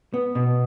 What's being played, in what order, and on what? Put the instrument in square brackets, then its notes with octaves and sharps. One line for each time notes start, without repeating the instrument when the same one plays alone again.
[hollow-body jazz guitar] B3
B2